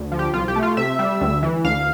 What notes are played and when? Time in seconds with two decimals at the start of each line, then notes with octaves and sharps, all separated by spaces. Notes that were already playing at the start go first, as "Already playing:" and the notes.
Already playing: D2
0.12 F3
0.19 G4
0.33 C2 F4
0.48 G4
0.56 A3
0.63 F4
0.77 C3 E5
0.99 G3
1.21 D2
1.43 E3
1.64 D2 F5